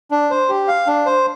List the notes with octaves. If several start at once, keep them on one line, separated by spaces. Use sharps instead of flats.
D4
C5
G4
F5
D4
C5